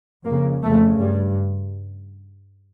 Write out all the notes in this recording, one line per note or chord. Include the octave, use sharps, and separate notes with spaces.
F2 C#3 A#3
F2 C#3 A3
G2 G3